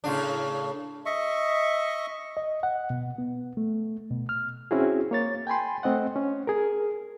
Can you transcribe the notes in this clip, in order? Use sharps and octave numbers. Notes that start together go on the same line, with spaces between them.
A2 C#3 D4
D#5 E5 C#6
D#5
F#5
B2
B3
A3
B2
F6
C4 C#4 E4 F#4 G#4
A#3 C#5 A6
G5 G#5 B5 C6
A3 C4 D#5 F#5
C#4
G#4 A#4